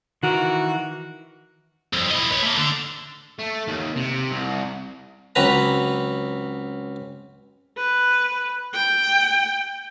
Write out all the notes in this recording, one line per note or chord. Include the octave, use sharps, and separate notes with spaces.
D#3 E3 F#4 A#4
C2 F2
E3 D#5
B4 C#5
A3 A#3
D3
A3
D#2
C3
C2
C#2 F#3 C4 B4 A#5
B4
G5